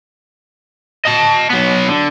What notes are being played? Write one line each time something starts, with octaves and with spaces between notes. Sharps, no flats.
D#5 A5
F#3 B3
D3